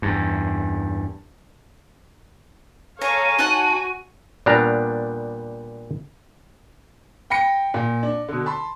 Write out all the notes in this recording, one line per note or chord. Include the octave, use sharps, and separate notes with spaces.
E2 G2
A4 C#5 F5 G#5 A#5
D#4 F#4 F#5 A5
A#2 G3 B3 D4 F5 A#5
G5 B5 A#6 C#7
A#2
D4
B2 D3
A5 B5 C6